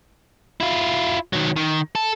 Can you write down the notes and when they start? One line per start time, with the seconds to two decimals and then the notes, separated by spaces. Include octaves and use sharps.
0.60 E4 F4
1.33 D#3 F#3
1.56 D#3
1.95 A4